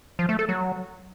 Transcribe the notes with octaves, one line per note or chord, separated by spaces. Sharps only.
F3
A3
A4
F#3